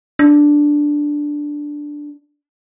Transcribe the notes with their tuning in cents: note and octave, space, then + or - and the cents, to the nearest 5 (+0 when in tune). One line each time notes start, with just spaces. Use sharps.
D4 +0